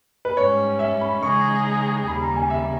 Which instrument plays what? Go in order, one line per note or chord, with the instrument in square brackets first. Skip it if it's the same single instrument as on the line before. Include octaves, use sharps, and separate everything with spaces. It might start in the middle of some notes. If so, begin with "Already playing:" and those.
[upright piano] B4
[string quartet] G#2 G3 C#4 [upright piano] C#5
[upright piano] E5
B5
[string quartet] C#3 E3 G#3 D#4 G#4 [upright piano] C#6
[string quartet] D#2 C#3 G3 [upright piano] B5
[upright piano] A#5
G#5
E5